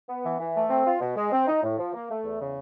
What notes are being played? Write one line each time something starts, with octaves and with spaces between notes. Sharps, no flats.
B3
E3
E3
A3
C4
F4
B2
G#3
C4
D#4
A2
F3
A#3
A3
E2
C#3